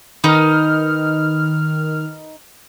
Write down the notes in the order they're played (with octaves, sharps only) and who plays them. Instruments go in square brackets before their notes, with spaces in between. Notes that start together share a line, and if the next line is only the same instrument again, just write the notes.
[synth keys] D#3 F6 [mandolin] D#4 B4 D#5